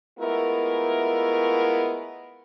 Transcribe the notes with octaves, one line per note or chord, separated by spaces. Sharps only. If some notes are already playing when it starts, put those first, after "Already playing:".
G#3 A3 B3 E4 F4 A#4